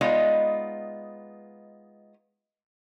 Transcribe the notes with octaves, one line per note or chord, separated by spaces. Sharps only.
G#3 B3 D#4 F4 D5 D#5